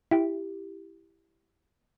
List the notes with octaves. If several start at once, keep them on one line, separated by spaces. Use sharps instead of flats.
E4 G4